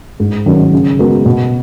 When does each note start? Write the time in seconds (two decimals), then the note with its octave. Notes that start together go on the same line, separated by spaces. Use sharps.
0.20 G#2
0.46 D#3 F#3 C#4
0.73 C#3
0.99 G#3 B3 F#4 A#4
1.26 B2